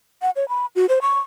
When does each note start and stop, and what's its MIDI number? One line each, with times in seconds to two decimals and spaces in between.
0.22 0.30 78
0.36 0.48 73
0.49 0.66 83
0.76 0.86 66
0.89 0.99 72
1.02 1.19 85